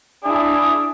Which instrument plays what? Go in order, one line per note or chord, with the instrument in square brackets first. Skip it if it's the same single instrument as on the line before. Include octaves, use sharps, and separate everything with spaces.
[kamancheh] D4 E4 [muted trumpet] G#4